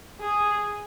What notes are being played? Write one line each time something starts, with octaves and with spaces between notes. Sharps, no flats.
G#4